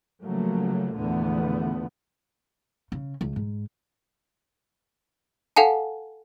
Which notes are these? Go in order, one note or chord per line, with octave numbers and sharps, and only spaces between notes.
C#3 F3 F#3 A3 A#3
E2 A#2 D3 F3 A3 B3
C#3
C#2
G#2
A4 F5 F#5 G#5 A5